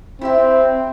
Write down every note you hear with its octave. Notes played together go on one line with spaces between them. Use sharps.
C4 E4 G4 E5